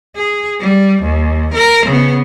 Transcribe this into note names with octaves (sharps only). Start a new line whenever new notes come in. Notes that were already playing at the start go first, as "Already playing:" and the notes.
G#4
G3
D#2
A#4
C#3 B3